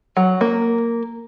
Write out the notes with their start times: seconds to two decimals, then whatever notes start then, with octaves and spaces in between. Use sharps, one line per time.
0.17 F#3
0.41 A#3